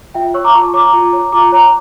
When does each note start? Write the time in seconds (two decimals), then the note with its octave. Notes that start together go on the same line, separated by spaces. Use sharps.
0.14 F4 E5 G5
0.34 C#5 C#6 E6
0.44 A#5 D6
0.54 F4 A5 C#6
0.74 C#5 A#5 D6
0.84 A#5 D6
0.93 F4
1.13 C#5
1.32 F4 A#5 D6
1.52 C#5 A#5 D6